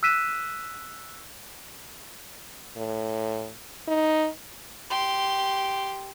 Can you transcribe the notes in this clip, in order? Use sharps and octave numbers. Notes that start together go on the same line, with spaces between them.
E6 F#6 B6 D#7 E7
A2
D#4
G4 C6